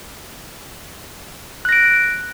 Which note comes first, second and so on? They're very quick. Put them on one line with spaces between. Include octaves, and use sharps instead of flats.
F#6 A#6 D7